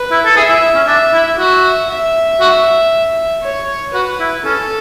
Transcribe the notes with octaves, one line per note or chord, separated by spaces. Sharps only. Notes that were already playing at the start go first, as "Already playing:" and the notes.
Already playing: B4
E4
A4
G#4 E5
E4
C#4
D4 E5
E4
F#4 E5
E5
F#4
C#5
F#4 B4
E4
C#4 A4